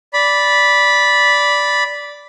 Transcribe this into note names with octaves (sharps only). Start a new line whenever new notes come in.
D5 B5